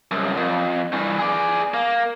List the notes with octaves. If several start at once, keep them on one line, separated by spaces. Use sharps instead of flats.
C2 F#2
F2
G2 E3
G#4 D5
A#3